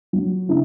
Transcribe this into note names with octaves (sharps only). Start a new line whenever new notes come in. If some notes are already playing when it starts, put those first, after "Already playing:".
F#3
C#3 E4